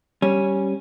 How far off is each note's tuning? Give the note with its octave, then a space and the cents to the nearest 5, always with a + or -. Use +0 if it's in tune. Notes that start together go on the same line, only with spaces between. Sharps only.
G3 -10 C#4 -10